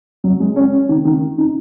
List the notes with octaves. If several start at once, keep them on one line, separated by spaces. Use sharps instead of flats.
F#3
G#3
C#4
D#3
D#3
D#4